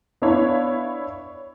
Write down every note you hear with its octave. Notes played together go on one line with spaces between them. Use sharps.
B3 D4 E4 C#5 F5 B5